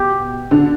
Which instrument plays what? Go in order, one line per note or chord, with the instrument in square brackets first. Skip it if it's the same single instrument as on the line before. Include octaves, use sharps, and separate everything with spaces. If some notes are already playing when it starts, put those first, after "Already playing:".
Already playing: [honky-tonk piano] B2 [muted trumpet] G4
[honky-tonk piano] D3 D4